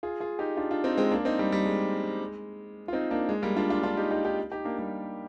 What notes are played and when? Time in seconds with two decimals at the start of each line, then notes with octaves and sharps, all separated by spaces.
0.03 F4 G#4
0.20 F4 G#4
0.39 D#4 G4
0.57 D4 F4
0.71 D4 F4
0.84 C4 D#4
0.97 G#3 C4
1.11 A#3 D4
1.25 C4 D#4
1.39 G3
1.52 G3
1.66 G#3
2.88 F4
2.93 C4 D#4
3.11 A#3 D4
3.29 G#3
3.42 G3 A#3
3.56 D4 F4
3.70 D4 F4
3.83 D4 F4
3.97 D#4 G4
4.11 D#4 G4
4.24 D#4 G4
4.51 D#4 G4
4.64 A#3 D4
4.78 G3 A#3